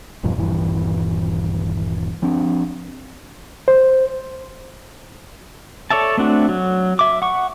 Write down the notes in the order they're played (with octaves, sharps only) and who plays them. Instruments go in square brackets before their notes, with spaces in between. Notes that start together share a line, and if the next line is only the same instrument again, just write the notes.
[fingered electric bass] D#1 G2 B2 F3
D#1 G2 E3
F3 C4 D4
[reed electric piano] C5
[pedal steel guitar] A4 C#5 D5 E5 A5
A3 C4 D4 F#4
F#3
E5 D6
F#5 C#6